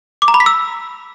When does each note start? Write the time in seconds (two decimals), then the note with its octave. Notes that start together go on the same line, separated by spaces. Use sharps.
0.22 D6
0.28 A#5
0.34 B5
0.40 B6
0.46 E6